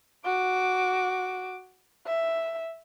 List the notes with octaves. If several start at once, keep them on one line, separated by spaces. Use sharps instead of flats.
F#4 D6
E5